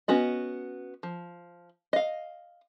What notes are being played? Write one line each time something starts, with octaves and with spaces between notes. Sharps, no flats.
B3 C#4 F#4 D#5
F3
D#5 F5